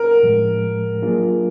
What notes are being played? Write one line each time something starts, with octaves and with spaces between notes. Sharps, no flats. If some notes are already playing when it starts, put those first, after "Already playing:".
Already playing: A#4
A2 F3 G#3
F#3 A#3 D4 F4 G#4